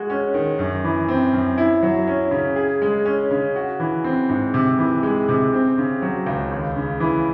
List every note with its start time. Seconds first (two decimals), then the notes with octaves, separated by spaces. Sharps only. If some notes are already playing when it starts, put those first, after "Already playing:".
Already playing: G#3 F#4
0.10 C#4
0.34 D#3
0.59 F#2
0.84 E3
1.08 C4
1.33 F#2
1.58 E4
1.83 F#3
2.07 C#4
2.31 C#3
2.56 G#4
2.82 G#3
3.05 C#4
3.31 C#3
3.56 F#4
3.80 E3
4.04 C4
4.29 G#2
4.54 C3
4.78 E3
5.03 G#3
5.29 C3
5.53 C4
5.78 C#3
6.02 F#3
6.26 C#2
6.51 D#2
6.76 C#3
7.00 E3